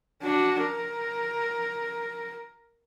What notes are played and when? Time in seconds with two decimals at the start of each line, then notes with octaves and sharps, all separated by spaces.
0.23 D4 F#4
0.62 A#4